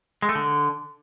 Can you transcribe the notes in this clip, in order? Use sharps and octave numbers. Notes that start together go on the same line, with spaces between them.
G#3
A3
D3